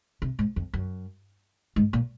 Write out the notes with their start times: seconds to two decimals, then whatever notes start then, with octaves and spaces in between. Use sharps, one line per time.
0.22 C3
0.39 G#2
0.56 F2
0.74 F#2
1.76 G#2
1.93 A#2